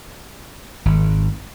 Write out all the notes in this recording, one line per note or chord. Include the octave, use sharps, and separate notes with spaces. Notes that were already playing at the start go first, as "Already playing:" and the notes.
G#1